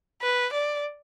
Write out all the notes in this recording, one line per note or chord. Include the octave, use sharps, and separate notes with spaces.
B4
D5